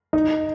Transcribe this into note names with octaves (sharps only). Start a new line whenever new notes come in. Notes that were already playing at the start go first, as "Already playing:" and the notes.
D#4